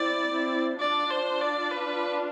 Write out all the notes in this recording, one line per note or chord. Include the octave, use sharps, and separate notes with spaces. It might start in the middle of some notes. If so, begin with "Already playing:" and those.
Already playing: C4 E4 D5
C4 E4
D4 F4 D5
C5
D5
B4